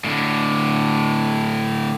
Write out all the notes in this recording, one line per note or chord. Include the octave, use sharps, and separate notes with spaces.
A2 D3